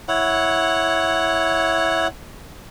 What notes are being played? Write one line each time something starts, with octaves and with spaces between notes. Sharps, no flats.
E4 C#5 F#5